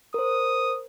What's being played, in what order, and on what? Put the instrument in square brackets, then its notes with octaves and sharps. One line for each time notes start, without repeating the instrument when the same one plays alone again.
[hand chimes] A#4 C5 [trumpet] D#6